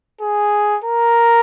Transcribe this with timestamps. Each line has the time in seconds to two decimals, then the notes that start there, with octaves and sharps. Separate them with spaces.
0.21 G#4
0.84 A#4